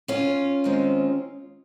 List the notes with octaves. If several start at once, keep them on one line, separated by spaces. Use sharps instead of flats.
C#4 F4
D#2 D#3 G#3 C4